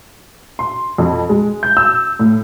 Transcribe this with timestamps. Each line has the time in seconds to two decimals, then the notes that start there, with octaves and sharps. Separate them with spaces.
0.59 C6
0.98 F2
1.29 G#3
1.63 G6
1.77 E6
2.19 A2